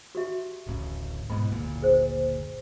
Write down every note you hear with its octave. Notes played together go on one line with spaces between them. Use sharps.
F#4 G4 E5
D1 A1 C#3
G#2 B2 E3 B5
F#1 D2 A#2
G#4 C5